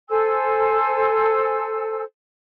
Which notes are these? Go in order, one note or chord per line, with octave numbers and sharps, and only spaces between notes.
A4 C5 G#5 E6